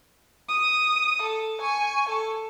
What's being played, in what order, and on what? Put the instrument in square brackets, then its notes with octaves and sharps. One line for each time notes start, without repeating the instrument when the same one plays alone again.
[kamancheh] D#6
A4
G#5 C#6
A4